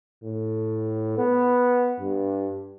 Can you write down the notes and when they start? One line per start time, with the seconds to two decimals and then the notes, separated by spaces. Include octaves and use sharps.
0.24 A2
1.18 B3
2.00 G2